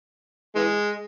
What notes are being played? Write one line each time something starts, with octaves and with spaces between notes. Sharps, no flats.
E3 G#3